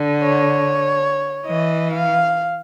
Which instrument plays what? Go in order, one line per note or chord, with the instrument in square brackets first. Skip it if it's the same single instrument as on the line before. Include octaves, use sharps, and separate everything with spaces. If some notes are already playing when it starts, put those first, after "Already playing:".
Already playing: [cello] D3
[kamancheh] C#5
[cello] E3 [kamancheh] D#5
[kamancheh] F5